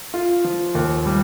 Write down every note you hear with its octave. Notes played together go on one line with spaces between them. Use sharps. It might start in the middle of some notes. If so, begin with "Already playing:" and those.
F4
F3
D#2
G3